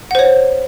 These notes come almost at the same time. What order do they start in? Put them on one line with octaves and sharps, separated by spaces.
F#5 C5 C#5